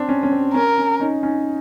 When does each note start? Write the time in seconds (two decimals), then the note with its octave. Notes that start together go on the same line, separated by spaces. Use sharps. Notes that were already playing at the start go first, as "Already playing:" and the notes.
Already playing: C4 D4
0.09 C#4
0.23 C#4
0.32 C4
0.54 C#4 A#4
0.78 C#4
1.00 C#4 D#4
1.23 C#4 D#4